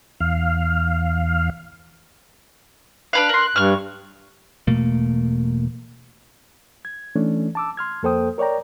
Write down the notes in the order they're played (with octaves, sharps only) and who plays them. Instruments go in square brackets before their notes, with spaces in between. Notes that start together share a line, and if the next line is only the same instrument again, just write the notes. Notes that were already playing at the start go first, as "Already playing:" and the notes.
[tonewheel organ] E2 F5
[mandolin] D4 B4 F5 [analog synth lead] F#6
[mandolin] A#4 C6
[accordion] G2 [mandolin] C#6 F6
[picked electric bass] E1 B2 A3 A#3
[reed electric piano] G#6
E3 A3 C#4 D4
A5 D6 E6
C6 F6 G#6
F2 A#3 A4 C5 G5 D#6
A#4 C#5 D5 G5 A#5